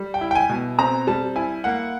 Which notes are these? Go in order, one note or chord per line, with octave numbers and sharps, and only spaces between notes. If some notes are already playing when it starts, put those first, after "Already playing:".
Already playing: G3
G5
E4
G5
G#5
B2
C4 A#5
G3 A5
E4 G#5
A#3 F#5